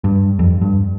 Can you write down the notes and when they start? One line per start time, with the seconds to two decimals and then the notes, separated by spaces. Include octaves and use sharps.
0.04 G2
0.39 F2
0.62 G2